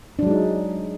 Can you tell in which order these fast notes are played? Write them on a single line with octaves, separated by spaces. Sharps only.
D4 F#3 G#3 D#4